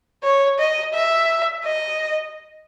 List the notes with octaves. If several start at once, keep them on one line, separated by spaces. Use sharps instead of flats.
C#5
D#5
E5
D#5